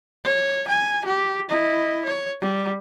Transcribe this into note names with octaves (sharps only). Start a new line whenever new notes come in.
C#5
G#5
G4
E4 D#5
C#5
G3